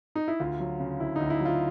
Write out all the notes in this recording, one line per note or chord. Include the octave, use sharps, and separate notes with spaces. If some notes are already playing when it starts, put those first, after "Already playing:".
D#4
E4
D2 F4
F#3
C#3
D2 E4
D2 D#4
E4
F#3 F4